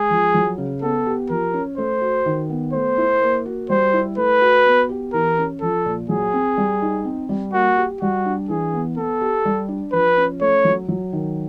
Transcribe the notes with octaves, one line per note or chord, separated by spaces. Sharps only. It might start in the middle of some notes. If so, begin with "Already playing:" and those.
Already playing: G#3 G#4
F3
F#3
C#3
B3 A4
G4
F3 A#4
C#4
A3 C5
F#4
D#3
B3
A3 C5
E4
A#3
F#4
G3 C5
E4
A3 B4
F#4
B3
G4
E3 A#4
C#4
F3 A4
A#2
F#3 G#4
C4
G3
D#4
C4
G3
A#3 F#4
G4
G3 F#4
D4
E3 G#4
B3
B3 A4
G4
G3
D4
F3 B4
C#4
A3 C#5
F#3
F#3
D#3